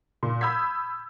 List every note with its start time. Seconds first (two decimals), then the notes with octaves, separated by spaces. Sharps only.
0.23 A#2
0.41 B5 D#6 E6 G6 G#6 B6